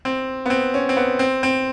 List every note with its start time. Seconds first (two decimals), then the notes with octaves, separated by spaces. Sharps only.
0.05 C4
0.46 B3
0.50 C4
0.74 C#4
0.89 C4
0.97 B3
1.19 C4
1.43 C4